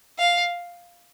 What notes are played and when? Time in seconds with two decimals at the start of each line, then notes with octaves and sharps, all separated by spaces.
0.18 F5